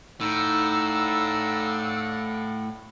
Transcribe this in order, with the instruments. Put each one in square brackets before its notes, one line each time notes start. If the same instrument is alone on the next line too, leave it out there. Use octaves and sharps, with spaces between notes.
[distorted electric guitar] A2 [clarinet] D#4 [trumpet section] D5 F5 F#5 [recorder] E6